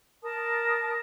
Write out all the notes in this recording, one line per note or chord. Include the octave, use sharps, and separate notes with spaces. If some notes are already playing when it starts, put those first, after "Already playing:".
A#4 A5 D#6